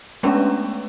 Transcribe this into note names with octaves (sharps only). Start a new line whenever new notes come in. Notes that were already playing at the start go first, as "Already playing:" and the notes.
G#3 A3 B3 C#4 D4 B4